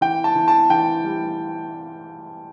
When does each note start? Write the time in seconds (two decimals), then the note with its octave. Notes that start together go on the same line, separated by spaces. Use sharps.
0.01 E3 G5
0.24 A5
0.35 E3
0.48 A5
0.70 E3 G5
1.04 G3